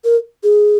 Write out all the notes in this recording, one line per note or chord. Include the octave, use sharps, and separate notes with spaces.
A#4
G#4